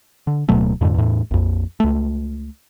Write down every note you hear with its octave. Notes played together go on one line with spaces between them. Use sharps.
D3
D1 B2 F#3 A3
F2 G#2 D3
E2 A2
A#1 F2
C#2 A3